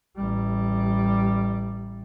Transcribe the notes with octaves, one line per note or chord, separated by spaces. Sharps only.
A1 G3